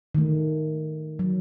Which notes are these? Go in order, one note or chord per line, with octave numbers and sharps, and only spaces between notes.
D#3 A3
F#3